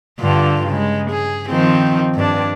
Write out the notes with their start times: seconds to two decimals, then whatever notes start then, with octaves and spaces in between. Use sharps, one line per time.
0.20 G2 D3 F4
0.67 C#3 G#3
1.11 G#4
1.50 D#3 F3 C4
2.15 G2 D4